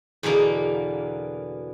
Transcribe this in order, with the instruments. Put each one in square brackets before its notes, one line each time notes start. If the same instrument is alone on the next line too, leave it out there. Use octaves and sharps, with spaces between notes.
[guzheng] E2 B2 D3 A#3